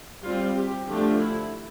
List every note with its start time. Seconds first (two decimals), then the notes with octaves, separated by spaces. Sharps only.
0.23 G3 C4 F4
0.56 G4
0.89 D3 F3 A3 D4 G4
1.21 E4